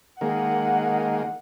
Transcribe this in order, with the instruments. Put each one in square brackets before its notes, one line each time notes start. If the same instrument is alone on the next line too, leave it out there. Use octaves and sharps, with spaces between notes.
[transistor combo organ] D#3 G#3 A#3 [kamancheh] F#5